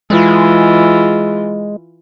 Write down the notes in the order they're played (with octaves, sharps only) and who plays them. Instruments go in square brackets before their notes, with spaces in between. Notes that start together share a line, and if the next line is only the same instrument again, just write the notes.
[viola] E3 F4 [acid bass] G#3